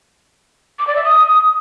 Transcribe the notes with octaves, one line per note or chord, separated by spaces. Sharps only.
D6
D5
E5
D#6